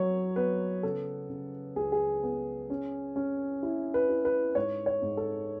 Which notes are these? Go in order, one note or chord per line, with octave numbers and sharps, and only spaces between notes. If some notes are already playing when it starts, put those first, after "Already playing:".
Already playing: F#3 C#5
B3 B4
C#3 A4
C#3
C#2 G#4
G#4
B3
C#4
C#4
E4
B4
E4
B4
G#2 C#5
C#5
G#2
A4